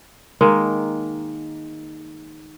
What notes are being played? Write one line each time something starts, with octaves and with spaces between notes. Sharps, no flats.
D#3 G#3 A#3